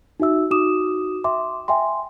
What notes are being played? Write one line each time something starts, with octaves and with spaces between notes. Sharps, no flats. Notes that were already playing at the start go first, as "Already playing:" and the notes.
D#4 F#4 E5 E6
D#4 F#4 D6 D#6 E7
E5 G5 C6 D6
E5 G5 G#5 C6